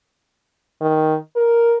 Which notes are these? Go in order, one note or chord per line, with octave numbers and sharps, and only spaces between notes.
D#3
A#4